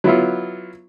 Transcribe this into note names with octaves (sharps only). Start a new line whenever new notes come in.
F#3 B3 E4 F4